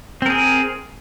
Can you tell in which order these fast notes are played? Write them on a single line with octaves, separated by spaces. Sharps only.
C4 A#4 G#4